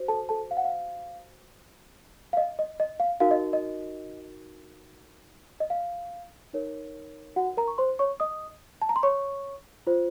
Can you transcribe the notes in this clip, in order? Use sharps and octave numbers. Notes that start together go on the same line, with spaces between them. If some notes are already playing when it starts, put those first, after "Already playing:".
Already playing: F#4 C5
A4 A5
A4 A5
F5
F#5
F5
F5
D#5
D#5
D#5
F5
D#4 F#4 A#4 F5
D#5
D#5
D#5
F5
D#4 A#4 C#5
F#4 F#5
A#4 A#5
C#6
C5 C6
C#5 C#6
D#5 D#6
A5
A#5
C6
C#5 C#6
F4 C5